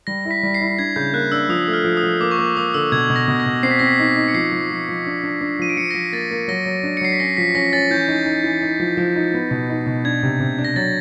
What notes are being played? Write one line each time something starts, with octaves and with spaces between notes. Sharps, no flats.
G3 A#6
E4
B6
G3
C7
E4
D4 G#6
C#3 G6
A#3 F#6
D4 E6
F3 D#6
A3
F6
F3
D#6
F3
A#3 D6
C#6
A#3 D6
A#3 D#6
D3 E6
B2 G#6
B2
A#6
B2
A#6
B2
C4 C7
B6
C4 A#6
B6
D#4
D#4
C#7
F3 C7
F3
F3
F3
D4
D4
D4
F3 D#7
D7
F3 C#7
A#6
F3 B6
A#3 A6
A#3
F#3 A#6
F#3
D4
C#7
F#3 C7
B6
C#4 A#6
F3 B6
C#4 A#6
C#4 A6
E3 G6
D#4
D#4
E3
D#4
F3
F3
D#4
B3
B2
D#4
B2
D4 G#6
C3
C3
D4
A#6
F#3 A6